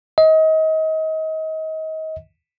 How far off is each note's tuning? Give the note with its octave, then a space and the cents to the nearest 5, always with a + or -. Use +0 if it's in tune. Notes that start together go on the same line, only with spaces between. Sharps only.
D#5 +30